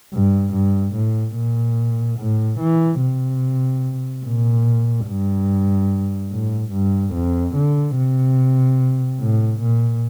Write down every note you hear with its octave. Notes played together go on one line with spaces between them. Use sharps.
G2
G2
A2
A#2
A2
E3
C3
A#2
G2
A2
G2
F2
D3
C3
A2
A#2